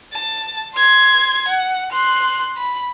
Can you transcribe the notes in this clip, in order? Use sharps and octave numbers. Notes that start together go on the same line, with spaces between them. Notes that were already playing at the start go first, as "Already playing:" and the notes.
A5
C6 G#6
F#5
C6 F#6
B5